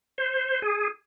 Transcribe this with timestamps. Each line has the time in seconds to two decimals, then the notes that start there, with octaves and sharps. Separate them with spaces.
0.18 C5
0.62 G#4